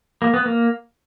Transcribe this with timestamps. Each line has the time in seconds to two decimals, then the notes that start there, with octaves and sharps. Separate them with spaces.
0.22 A#3
0.34 B3
0.46 A#3